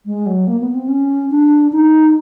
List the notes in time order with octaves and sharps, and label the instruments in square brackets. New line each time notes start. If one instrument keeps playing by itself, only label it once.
[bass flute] G#3
F#3
A#3
B3
C4
C#4
D4
D#4